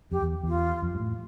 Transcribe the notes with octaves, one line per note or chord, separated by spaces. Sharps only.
F2 G4
E2
E2 F4
F2
G2
A2